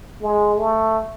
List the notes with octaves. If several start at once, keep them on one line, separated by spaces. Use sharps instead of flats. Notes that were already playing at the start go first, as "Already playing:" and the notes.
G#3
A3